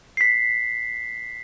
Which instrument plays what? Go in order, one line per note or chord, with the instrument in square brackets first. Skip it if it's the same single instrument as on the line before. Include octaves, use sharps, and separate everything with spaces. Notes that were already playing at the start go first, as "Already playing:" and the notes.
[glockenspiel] B6 C7